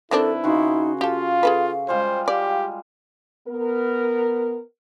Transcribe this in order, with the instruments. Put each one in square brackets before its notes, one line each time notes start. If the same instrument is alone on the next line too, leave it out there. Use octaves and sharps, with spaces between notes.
[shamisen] D#3 C4 D4 [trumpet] E4 [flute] A4 [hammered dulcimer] B4
[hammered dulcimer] C#3 F#4 C6 [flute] D#4
[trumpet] F4 [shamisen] G4 A4 [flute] F5
[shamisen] G#4 A4 B4
[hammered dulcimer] G3 G#3 F4 [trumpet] C5
[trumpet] G4 [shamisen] D5 [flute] F5
[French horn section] B3 A#4